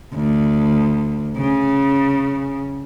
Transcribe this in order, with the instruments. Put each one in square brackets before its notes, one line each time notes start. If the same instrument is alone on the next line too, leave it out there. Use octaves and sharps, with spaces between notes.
[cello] D2
C#3